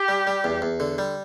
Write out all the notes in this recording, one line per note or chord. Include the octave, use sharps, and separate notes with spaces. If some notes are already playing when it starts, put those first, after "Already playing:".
Already playing: G4
G3
G3
E2
E2
D3
G3